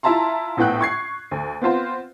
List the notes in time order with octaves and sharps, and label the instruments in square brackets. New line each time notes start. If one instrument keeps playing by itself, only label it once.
[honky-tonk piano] E4 F4 E5 A5 A#5 C6
A#1 A2 B3 G5 F#6
C#6 G#6 C7
D2
B3 C4 F4 C5